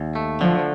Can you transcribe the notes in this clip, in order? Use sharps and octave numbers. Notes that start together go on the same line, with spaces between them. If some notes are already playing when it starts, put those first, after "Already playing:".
Already playing: D#2
A3
D3 F3